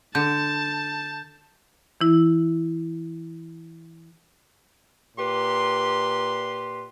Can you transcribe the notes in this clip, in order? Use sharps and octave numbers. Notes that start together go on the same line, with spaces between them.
D3 A5 G6
E3 E4
A#2 G4 B4 C6